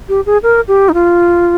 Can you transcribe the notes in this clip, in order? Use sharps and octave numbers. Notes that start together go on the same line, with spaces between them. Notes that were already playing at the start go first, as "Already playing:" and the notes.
G4
G#4
A#4
G4
D#4
F4